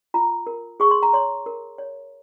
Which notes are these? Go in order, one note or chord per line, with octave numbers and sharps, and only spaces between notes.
F4 A#5
A#4
G#4 C#6
C6
A#5
C#5 C6
A#4
C#5